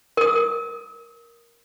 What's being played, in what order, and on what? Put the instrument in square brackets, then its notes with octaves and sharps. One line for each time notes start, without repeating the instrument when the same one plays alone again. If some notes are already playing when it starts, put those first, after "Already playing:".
[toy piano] A#4 D#6